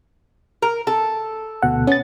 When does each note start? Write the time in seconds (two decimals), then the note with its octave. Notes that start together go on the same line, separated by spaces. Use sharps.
0.62 A#4
0.87 A4
1.62 D2 B2 F#5
1.87 B3 C#4 A6